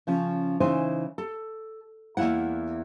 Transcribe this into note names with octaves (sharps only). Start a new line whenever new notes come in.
C#3 F3 C#4
C#3 E3 D#4 C5 G#5
A4
E2 D#3 A#3 E4 F#5